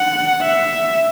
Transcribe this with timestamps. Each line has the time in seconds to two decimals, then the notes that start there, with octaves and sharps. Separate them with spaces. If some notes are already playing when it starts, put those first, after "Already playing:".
Already playing: F#5
0.41 E5